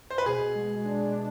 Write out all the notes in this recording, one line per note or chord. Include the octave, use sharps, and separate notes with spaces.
C5
B4
B2 G#4
G#3
D4